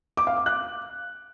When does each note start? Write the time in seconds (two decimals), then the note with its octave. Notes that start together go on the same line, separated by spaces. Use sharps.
0.17 D6
0.27 F5
0.37 D6
0.46 F#6